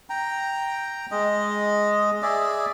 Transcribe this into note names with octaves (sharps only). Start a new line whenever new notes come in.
G5 A#5
G#3 D#5
G#4 D5 E5